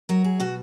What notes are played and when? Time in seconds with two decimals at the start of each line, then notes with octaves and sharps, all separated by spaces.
0.09 F#3 A#4
0.24 G#4
0.40 B2 F#4